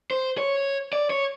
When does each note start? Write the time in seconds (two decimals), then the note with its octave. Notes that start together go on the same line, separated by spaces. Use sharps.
0.11 C5
0.38 C#5
0.93 D5
1.10 C#5